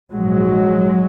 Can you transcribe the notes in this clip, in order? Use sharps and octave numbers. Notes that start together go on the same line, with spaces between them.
A#1 G#2 F#3 G#3